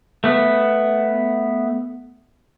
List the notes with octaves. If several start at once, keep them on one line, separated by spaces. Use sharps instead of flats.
A3 B3